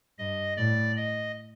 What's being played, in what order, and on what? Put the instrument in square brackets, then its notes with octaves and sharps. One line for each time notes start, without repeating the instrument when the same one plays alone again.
[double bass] G2 [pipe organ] D#5
[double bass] A2 [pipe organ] D5
[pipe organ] D#5